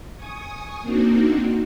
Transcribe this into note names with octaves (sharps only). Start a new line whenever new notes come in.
G#5 C#6 D#6
A#3 C4 D4 D#4 F#4